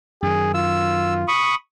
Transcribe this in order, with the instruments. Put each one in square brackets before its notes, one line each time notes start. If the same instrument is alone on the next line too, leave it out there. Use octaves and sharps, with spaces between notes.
[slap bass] F#2 D#3 [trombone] G#4
[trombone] F4 [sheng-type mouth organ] E6
[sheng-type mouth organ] B5 C#6 D#6